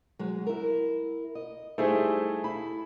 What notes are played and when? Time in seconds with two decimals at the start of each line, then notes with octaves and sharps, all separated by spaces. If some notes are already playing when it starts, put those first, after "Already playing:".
0.19 F#3 G#3
0.47 E4 A#4
1.35 D#5
1.78 G3 A3 D#4 E4 G#4 C5
2.44 E4 B5